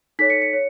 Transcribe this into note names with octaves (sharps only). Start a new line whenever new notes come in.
D#4 A4 C#5 B6
C#7
C#7
C#5